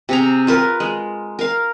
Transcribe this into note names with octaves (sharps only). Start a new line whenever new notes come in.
C3 G#4 A#5
F4 A#4 B4
G#3
A#4 F5